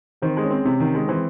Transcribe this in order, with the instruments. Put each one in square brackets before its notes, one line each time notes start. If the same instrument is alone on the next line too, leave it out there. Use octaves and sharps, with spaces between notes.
[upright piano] D#3 [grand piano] C4 C5
[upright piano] G#3
[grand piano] C#4 C#5
[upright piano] C4
C3
D#3
G#3
[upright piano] E3 [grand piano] C4 C5